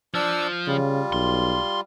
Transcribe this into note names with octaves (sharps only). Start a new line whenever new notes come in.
F3 D4 E6
C#3 G3 F4
B1 C6